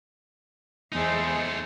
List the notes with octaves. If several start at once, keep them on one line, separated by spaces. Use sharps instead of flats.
E2 G#3 A3 D#4 C5